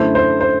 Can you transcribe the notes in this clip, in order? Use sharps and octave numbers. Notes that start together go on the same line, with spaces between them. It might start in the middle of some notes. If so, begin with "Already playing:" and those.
Already playing: F#2 D3 A3 E4 C5
C5
C5